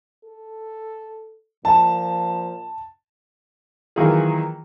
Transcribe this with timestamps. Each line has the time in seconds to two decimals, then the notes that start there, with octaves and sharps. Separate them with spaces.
0.24 A4
1.65 A#2 F3 A5
3.96 D#3 E3 F#3 A#3 F4 G#4